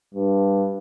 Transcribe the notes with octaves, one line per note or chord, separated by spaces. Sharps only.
G2